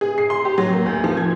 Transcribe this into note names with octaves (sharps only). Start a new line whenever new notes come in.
G#4
C7
C6
G4
F#3
A#3
D2
F3
G#6